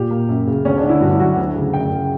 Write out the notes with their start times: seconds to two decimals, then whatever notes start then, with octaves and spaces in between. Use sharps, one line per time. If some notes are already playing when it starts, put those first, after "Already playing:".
Already playing: A#2 G4
0.11 A#3
0.29 F#2
0.47 C#3
0.65 D2 C#4
0.77 D4
0.83 D3
0.89 E4
1.01 G2 F#4
1.12 E4
1.20 F#3 F#4
1.37 D2
1.56 C#3
1.74 F#2 G5
1.92 C#3